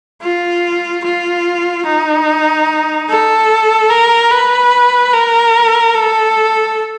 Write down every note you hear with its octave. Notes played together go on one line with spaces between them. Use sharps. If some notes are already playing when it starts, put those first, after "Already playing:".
F4
F4
D#4
A4
A#4
B4
A#4
A4